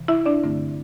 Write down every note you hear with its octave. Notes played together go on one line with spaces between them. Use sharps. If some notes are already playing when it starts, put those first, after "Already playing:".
Already playing: C3 E3
E4 E5
D4 D5
G2 D3 A3 C4